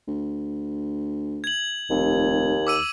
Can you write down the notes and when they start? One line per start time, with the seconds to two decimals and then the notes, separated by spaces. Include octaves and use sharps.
0.08 D2
1.44 G#6 F#7
1.90 F1 D#2
2.67 D6 E6 D#7